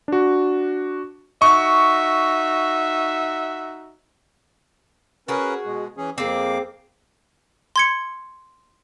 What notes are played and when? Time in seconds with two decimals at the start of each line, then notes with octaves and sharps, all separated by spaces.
0.08 D4 F#4
1.42 D#4 F#4 E5 C#6
5.28 C#4 F#4 G#4 A#4 B4
5.66 B2 G#3
5.97 E3 C#4 G#4
6.18 F2 A#3 C4 G#4 D6
7.76 C6 G#6 C#7